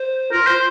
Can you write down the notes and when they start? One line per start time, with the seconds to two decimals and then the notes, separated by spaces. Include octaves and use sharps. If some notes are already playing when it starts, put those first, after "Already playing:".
Already playing: C5
0.32 F4 A#4
0.47 C5
0.52 F4